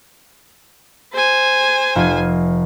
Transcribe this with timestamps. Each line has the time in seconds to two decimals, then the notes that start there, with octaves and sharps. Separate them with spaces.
1.13 C5 G#5
1.96 F1 F4